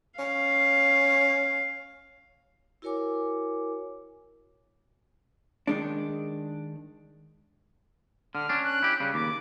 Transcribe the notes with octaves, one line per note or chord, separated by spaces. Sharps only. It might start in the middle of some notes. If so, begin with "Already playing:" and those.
C#4 F5
E4 F#4 A#4 C#5 G#5 D6
D#3 G#3 D4
D3 F6
C#4 D4
F#6
E4 G4
C#3 G3
D#2 D6